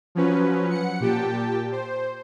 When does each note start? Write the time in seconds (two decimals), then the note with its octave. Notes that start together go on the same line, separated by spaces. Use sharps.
0.15 F3 F#3 C#4 B4
0.71 F#5 C#7
1.00 A#2 G4 G5 A5
1.72 C5